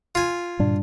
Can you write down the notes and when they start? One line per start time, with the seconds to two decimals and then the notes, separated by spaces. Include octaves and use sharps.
0.15 F4 G#5
0.59 G2 A#2 D3 D4